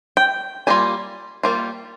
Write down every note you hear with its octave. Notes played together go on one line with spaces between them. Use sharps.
G5
G3 A#3 F4 G#5
G3 A#3 F4